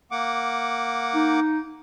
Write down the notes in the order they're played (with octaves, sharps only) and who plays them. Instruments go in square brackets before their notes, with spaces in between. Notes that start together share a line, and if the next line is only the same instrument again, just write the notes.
[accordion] A#3 F#5 D6
[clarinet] D#4